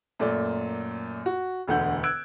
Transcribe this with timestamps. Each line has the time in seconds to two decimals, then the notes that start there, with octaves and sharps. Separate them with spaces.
0.19 F#2 A#2 A3 D5
1.26 F#4
1.68 E1 D2 D3 F#5 G6
2.03 E6 F#6 G#6 D7